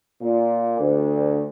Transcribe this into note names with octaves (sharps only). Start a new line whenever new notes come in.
A#2
D2